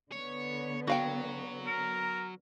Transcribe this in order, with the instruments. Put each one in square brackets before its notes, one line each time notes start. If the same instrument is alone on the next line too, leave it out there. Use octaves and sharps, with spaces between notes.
[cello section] D3 B3 [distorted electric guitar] C#5
[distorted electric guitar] F#3 [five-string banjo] F#4 F5 G5
[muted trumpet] A#4